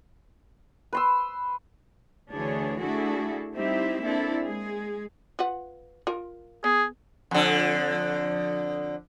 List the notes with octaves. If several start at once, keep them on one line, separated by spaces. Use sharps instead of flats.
B4 C6 E6
D2 D3 E3 D4 G#4 C#5
A3 D4 E4 F#4 G#4 A4
G3 C4 D#4 E4 G4 E5
A#3 C4 D4 E4 A4
G#3 G#4
F4 B4 F#5
F4 A#4
B3 G#4
F2 D3